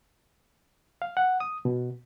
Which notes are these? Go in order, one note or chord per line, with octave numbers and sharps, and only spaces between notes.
F5
F#5
D#6
B2